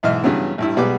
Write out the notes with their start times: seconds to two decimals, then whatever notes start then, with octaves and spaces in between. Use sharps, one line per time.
0.03 B1 G#2 E3 D#5 E5 F6
0.24 G2 C#3 E3 F#3 B3
0.58 A1 G2 E4
0.76 B1 B2 G3 G#3 B4 D6